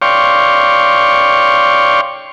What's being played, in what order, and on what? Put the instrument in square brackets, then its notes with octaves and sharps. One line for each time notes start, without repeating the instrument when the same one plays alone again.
[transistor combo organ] C#5 D5 F5 G5 C6 C#6